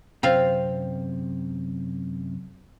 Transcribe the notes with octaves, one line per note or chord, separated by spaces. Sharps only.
F#2 C3 C4 F4 F5